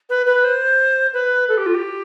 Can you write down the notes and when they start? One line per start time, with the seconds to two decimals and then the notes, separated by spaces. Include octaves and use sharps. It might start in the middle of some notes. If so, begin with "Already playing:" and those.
0.10 B4
0.26 B4
0.44 C5
1.13 B4
1.49 A4
1.57 G4
1.66 F4
1.74 G4